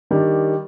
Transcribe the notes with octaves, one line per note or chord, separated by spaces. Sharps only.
D#3 G3 D4